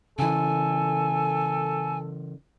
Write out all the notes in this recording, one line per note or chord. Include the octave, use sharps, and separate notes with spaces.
C#3 E3 A4 G#5